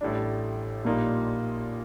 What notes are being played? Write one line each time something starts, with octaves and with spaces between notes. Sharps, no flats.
A1 A2 G3 D4
A#1 A#2 G3 A#3 D#4